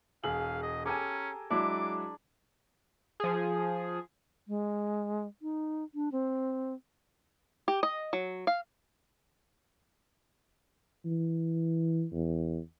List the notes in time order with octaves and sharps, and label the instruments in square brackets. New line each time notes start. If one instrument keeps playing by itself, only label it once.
[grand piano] E1 F#7 [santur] G#4 [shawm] F5
[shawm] D#5
[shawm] C#4 [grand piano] G4 A4 D6 [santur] A#4 G#5
[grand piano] F#3 G#3 E4 [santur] D4 [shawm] D6
[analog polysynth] F3 G#4
[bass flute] G#3
D#4
D4
C4
[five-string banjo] G4
D#5
F#3
F5
[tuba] E3
E2